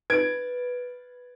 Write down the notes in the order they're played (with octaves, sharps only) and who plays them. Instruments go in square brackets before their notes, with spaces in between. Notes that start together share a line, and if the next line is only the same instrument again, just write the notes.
[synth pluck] B4 A6 [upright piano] G#6 D7